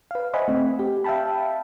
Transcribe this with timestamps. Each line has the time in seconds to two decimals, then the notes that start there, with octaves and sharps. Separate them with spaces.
0.11 B4 F5
0.34 C5 D#5 E5 F#5 G#5 B5
0.48 A3 C4
0.79 G4
1.04 E5 F5 G5 A5 B5